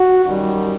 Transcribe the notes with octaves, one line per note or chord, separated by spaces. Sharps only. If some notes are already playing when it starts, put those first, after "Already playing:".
Already playing: F#4
F#2 D#3 G3